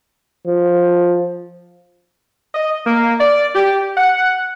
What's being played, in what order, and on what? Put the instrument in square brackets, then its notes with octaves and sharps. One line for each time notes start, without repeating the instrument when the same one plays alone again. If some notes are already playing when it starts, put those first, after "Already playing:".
[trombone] F3
[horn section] D#5
A#3
D5
G4
F#5